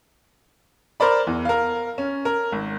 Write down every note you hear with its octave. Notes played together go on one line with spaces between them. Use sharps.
A#4 C5 D5 B5
E2
A#4 F5
C#4
A#4
G#1